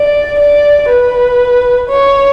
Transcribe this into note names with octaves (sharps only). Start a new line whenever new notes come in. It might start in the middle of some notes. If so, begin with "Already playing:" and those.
Already playing: D5
D5
B4
C#5